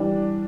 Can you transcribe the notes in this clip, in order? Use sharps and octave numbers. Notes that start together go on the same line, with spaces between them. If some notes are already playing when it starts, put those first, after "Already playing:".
Already playing: E3 G3 D4